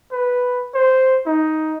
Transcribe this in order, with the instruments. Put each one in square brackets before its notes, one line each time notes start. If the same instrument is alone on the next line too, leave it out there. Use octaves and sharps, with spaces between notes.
[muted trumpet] B4
C5
D#4